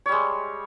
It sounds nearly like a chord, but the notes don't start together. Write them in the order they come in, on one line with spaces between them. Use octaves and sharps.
C#5 G3 G#3